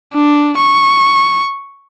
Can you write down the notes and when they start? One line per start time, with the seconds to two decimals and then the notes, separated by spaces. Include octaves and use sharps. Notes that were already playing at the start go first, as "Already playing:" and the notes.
0.14 D4
0.57 C#6